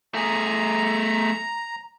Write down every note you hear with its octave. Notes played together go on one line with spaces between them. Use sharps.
A3 G#4 A#5